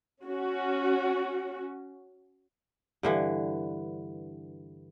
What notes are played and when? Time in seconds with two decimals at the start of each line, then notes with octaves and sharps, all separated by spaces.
0.24 C#4 F#4
3.03 G2 D3 E3